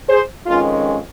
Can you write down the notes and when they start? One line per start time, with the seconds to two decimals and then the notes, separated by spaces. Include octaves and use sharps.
0.09 G#4 C5
0.46 F2 D#3 G#3 C#4 F4